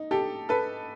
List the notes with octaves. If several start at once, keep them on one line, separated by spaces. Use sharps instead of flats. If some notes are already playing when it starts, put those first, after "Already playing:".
Already playing: D#4
G4 A4
A4 B4